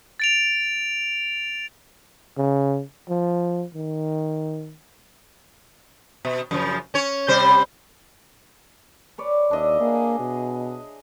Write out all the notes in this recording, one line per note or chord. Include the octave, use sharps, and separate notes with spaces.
A6 D7 F7
C#3
F3
D#3
B2
F#2 C#3 F3
C#4 C#5
C3 G3 C5
B4 C#5 D5
D#2 D4 D#5 E5
A#3 G#4
B2